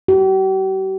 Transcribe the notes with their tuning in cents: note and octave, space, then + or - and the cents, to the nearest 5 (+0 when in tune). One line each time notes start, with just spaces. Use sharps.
G4 -45